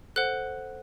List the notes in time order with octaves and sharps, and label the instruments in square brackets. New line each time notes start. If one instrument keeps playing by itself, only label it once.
[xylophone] A4 C5 F#5 F#6